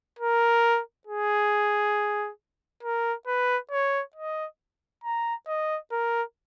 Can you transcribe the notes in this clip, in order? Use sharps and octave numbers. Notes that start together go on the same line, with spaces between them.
A#4
G#4
A#4
B4
C#5
D#5
A#5
D#5
A#4